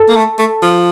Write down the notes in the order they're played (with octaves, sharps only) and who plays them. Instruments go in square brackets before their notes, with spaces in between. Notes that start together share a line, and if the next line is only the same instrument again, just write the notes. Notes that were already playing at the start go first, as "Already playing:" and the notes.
Already playing: [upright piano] A4
[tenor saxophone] A#3
A3
A3
F3